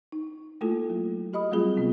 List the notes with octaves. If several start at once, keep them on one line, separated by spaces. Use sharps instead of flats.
D#4
A3 A#3 E4 F4 A4
F#3
F#4 G4 D#5 B5 D#6
F#3 G3 A3 C4 F4 G#4
C3 B3 C4